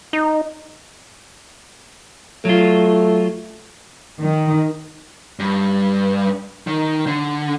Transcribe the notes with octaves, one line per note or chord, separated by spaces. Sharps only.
D#4
F#3 A3 F4
D#3
G2
D#3
D3